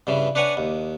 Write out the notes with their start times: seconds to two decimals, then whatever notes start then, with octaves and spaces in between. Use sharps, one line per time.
0.07 G2 C#3 E3
0.35 D4 B4 C#5 F#5 G#5
0.57 D#2